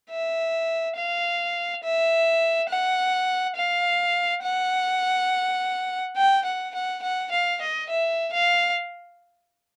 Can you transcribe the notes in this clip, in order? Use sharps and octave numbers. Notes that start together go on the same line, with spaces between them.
E5
F5
E5
F#5
F5
F#5
G5
F#5
F#5
F#5
F5
D#5
E5
F5